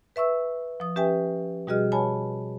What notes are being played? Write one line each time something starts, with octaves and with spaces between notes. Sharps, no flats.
B4 E5 C#6 E6
F3 D#6
C#4 G4 B4 E5 G5 G#5
B2 G3 F#4 G#4 D#5 F6
C#5 G#5 A5 B5